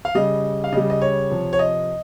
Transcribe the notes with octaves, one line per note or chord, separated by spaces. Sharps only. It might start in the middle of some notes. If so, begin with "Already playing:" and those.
F5
C#3 G3 D#5
F5
C#3 G3 D#5
D#5
C#5
C3 F3
C#5
D#5